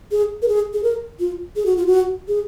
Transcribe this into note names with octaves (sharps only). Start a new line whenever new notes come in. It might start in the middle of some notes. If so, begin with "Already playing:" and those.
G#4
A#4
G#4
G#4
A#4
F4
G#4
F#4
F4
F#4
G#4